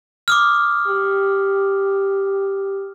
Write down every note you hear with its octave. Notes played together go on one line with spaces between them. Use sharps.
D6 D#6 F6
G4